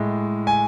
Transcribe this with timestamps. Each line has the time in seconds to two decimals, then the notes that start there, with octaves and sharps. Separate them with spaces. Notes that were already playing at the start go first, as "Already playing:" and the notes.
Already playing: A2 G#3
0.47 G#5